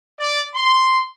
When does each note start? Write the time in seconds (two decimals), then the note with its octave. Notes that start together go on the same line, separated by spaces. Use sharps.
0.18 D5
0.55 C6